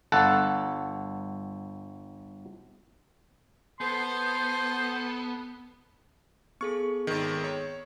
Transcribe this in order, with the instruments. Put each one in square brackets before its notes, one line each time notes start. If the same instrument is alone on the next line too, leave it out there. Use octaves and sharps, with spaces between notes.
[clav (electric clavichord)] G1 A4 F#5
[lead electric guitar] B3 [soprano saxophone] A4 [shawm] C5 [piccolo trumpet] C6
[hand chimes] B3 G#4 A4 [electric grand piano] C#6
[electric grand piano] G#1 D#3
C#5